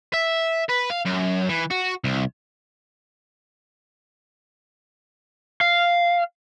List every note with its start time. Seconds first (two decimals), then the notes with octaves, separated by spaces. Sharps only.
0.14 E5
0.69 B4
0.90 F5
1.06 F#2
1.49 E3
1.71 F#4
2.04 C2
5.61 F5